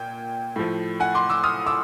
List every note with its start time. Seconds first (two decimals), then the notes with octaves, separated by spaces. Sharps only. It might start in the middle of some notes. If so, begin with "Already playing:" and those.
Already playing: A#2 G5
0.56 A2 F3 A3
1.00 F#5 G#5
1.15 C6 D6
1.30 D6 E6
1.44 D#6 F6
1.66 D6 E6